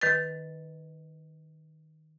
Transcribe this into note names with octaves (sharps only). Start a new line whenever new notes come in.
D#3 B4 A6